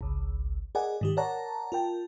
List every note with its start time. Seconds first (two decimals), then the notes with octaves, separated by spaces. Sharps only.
0.01 G#1 C#2
0.75 G#4 A#4 D5 D#5 F#5 G#5
1.01 G#2 D#3 G4
1.17 A#4 C#5 D5 F#5 A5 A#5
1.72 F4 A#4 G5 A5